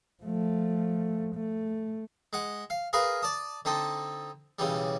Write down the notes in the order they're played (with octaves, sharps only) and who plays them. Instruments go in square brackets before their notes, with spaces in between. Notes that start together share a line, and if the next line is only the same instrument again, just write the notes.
[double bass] F3 A3
A3
[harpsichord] G#3 F#5
F5
G#4 A#4 B4 F5
D5 A5 D#6
D3 C4 D#4 A5
B1 C#3 E3 G3